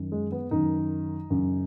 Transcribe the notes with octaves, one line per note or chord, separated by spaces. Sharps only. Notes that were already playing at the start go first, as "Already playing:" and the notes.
Already playing: F#2 D#3
G#3
B3
F#2 D#3 D#4
F#2 C#3